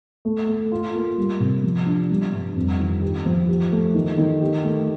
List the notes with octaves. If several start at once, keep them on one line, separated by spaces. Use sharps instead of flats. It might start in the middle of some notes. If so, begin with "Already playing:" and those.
A3
A3
F4
A#3
G3
C3
F3
D4
G3
G2
F2
D#3
G4
F3
G4
A3
D#3
D#3
G4
A3